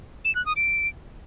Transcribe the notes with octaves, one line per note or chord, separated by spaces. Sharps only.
E7
F#6
D#6
D7